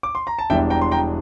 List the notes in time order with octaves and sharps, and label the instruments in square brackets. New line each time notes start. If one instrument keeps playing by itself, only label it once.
[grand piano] D6
C6
A#5
A5
E1 E2 E3 G3 D4 E5 G5
G5 A#5
C6
G5 A#5